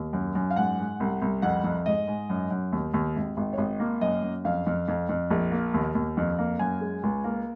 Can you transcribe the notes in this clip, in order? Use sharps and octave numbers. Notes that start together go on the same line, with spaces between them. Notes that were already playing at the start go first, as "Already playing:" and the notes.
Already playing: D#2
F#2
F#2
F5
G#2 F#5
G#2
C2
C2
F2 F#5
F2
G#2 D#5
G#2
F#2
F#2
D#2
D#2
G#1
G#1
C#5
G#1 D#5
A#3
F#2 D#5
F#2
F2 F5
F2
F2
F2
A#1
A#3
D#2
D#2
F2
A#3
F#2 G#5
G#3
C#2
A#3